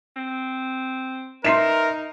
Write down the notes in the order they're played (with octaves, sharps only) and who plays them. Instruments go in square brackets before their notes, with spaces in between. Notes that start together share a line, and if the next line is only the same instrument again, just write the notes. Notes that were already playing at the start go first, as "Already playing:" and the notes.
[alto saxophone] C4
[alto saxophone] D#4 [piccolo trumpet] A#4 [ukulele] B4 E5 [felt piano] C6 C7 E7